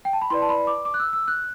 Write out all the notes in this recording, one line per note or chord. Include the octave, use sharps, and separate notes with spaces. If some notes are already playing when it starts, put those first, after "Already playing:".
G5
A5
B5
E4 B4 D5 C6
A5
B5
D6
D6
F#6
E6
E6
F#6